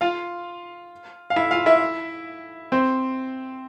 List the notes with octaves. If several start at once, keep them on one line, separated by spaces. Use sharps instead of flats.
F4 F5
F5
E4 E5
F4 F5
E4 E5
C4 C5